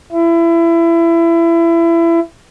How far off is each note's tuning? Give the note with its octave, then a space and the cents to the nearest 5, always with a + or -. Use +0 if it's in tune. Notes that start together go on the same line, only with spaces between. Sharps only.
E4 +25